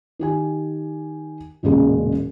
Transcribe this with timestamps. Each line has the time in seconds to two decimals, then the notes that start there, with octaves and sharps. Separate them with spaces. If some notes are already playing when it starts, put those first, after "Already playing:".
0.19 D#3 G4 G#5
1.63 E1 A1 A#2 C#3 G#3 G#4